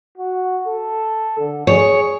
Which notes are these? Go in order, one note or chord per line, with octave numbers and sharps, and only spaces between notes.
F#4
A4
D3
G#4 C#5